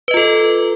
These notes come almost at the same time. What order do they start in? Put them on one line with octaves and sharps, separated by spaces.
B4 D#5 F4 A4